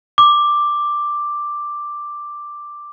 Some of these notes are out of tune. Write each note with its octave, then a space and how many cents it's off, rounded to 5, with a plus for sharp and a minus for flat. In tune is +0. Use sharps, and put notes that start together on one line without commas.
D6 +5